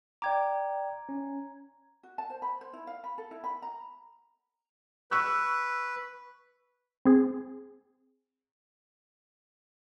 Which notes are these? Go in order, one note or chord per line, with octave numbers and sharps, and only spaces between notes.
D5 G5 A#5 D6 G#6
C#4
F#4
A5
C5
B5
C5
E4
F5
B5
A4
E4
B5
A#5
B4 C#6 E6 F#6
C4 G#4